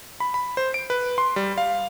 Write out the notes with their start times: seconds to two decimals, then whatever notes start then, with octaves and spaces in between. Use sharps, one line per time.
0.20 B5
0.34 B5
0.57 C5
0.74 D7
0.90 B4
1.18 C6
1.36 G3
1.58 F5